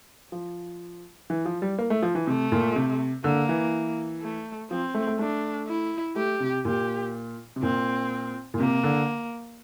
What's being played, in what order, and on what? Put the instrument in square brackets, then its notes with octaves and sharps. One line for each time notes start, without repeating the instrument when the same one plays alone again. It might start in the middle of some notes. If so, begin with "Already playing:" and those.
[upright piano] F3
E3
F3
G3
A#3
A3
F3
E3
[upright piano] C3 [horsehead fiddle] A3
[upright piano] A#2
C3
[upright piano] D3 [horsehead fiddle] A#3
[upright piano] E3
[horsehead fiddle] A3
[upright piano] F3 [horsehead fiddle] C4
[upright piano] A3
A3
[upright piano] A3 [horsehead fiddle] D4
[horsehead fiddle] E4
[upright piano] A3 [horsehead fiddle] G4
[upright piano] C3
[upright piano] A#2 [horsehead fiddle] G4
[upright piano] C3
[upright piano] A#2 [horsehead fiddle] C4
[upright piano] A#2
[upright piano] C3 [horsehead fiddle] A#3
[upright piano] D3